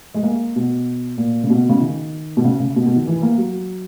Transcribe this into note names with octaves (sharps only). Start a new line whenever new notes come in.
G#3
A#3
B2
A#2
C#3
B2
C#3
D#3
B2
C#3
C#3
B2
B2
D#3
E3
A#3
F#3